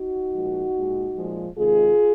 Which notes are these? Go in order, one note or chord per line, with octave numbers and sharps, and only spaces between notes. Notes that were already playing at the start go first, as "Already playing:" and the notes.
Already playing: D#4 F#4
A#2 F3 G#3
A#2 G#3
A#2 F3 G#3
C3 D#3 G#3 F4 G#4